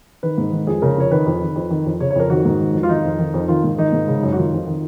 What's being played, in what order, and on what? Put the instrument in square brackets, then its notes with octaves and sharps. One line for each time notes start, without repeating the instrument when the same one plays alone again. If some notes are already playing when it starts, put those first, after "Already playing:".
[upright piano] D#3 B4
G#2
D#3
F2 G#4
C#3 A#4
F2 C#5
D#3 B4
F2
D#3
F2
D#3
F2
C#3 C#5
C#5
F2 A#4
D#3 F#4
G#2
D#3
F2
F4
D#3 D#4
F2
D#3
F2
D#3 F4
G#2
D#3 D#4
G#2
C#3
F#2
F#4
D#3 F4
F2
D#3